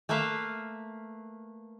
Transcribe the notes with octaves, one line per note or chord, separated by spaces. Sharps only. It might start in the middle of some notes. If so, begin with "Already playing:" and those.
A3 A#3 B4 E5 F5